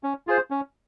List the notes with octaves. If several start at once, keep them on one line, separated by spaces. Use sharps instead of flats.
C#4
F4 G#4 C5
C#4